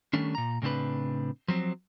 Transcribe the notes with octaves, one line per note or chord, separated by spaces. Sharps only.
D#3 G3 A3 C#4 D4
A#2 A#5
A2 C#3 C4 D4 B4
F3 F#3 C4